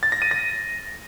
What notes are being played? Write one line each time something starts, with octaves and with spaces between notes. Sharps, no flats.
A6
A#6
D#7
A#6